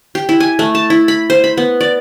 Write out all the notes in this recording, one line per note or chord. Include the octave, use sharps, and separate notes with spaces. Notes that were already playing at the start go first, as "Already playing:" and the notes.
G4
E4
G#5
A3
A5
E4
B5
C5
B5
B3
D5